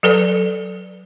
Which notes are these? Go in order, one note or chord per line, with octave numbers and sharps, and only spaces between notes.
F#3 A4 B4 D5